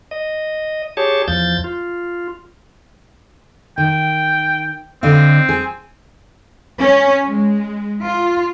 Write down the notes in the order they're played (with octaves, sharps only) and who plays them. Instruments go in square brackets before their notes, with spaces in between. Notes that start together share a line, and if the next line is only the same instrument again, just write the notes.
[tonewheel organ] D#5
G4 G#4 C#5 A5
E2 F3 G6 A6
F4
[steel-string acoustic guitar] D#3 [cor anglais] G5
[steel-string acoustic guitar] D3 D#5 F5 [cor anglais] C4
[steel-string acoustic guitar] G#4
[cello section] C#4
G#3
F4